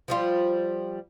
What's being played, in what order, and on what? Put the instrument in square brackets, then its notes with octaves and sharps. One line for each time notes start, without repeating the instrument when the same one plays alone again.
[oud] F3 G3 F4